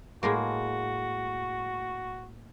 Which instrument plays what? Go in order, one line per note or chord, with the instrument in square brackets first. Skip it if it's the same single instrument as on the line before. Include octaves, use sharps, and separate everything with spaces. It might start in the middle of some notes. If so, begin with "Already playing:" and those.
[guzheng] A2 G#3 A#3 [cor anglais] F#4